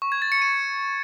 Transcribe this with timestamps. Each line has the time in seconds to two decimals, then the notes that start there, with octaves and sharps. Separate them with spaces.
0.02 C#6
0.12 G#6
0.22 A6
0.32 C#7
0.42 D#7